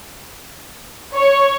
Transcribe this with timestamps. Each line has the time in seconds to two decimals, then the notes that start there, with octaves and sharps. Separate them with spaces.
1.14 C#5